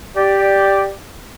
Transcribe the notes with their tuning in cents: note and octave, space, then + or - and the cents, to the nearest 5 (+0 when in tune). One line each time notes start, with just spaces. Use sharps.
G4 +0 D5 +0